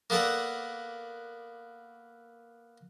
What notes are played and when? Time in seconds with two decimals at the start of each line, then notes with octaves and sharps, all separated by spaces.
0.10 A#3 B3 A4 D5 F#5